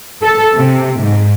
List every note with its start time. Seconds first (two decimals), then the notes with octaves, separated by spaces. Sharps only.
0.23 A4
0.55 C3
1.00 G#2